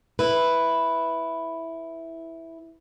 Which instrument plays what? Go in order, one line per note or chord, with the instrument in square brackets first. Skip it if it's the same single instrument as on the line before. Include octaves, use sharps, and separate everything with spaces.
[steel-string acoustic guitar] E4 B4